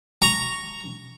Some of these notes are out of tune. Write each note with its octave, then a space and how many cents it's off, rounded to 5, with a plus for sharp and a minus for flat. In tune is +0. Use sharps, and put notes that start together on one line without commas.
A#5 -5 C#6 +0